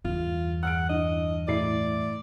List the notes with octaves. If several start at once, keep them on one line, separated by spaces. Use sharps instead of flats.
E2 G2 F4
F#5 E6 F6 D7
D4 E4 D#5
A2 E4 D5 C7